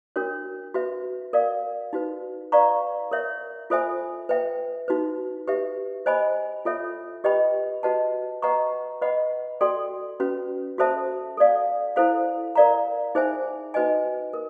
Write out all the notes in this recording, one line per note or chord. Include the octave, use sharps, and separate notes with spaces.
D4 F#4 A#4 C#5
F#4 B4 E5
A#4 D5 F5
D#4 F#4 B4
B4 D5 F5 A#5 C#6
A#4 C#5 E5
F4 A4 C5 E5 G#5
B4 E5 G5
D#4 F#4 B4
G4 B4 E5
C5 D#5 G#5 B5
F4 A4 C#5 E5
G4 B4 D#5 G5 B5
F#4 B4 D#5 F#5 A5
B4 D#5 F#5 A#5 C#6
B4 D#5 F#5 B5
F#4 A4 D5 G5 C6
C#4 F#4 B4
F#4 A4 C5 E5 A5
A4 D5 F5
E4 A4 C5 F5
A#4 D5 F5 A#5
D#4 G#4 C5 E5 G#5
D#4 F#4 B4 D#5 G#5
A#4